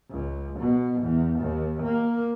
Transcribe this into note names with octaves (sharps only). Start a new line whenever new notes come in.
C#2
B2
E2
D#2
A#3